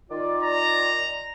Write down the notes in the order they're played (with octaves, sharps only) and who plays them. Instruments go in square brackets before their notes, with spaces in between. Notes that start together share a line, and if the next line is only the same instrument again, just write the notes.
[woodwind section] D#3 F4 D5
[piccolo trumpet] A#5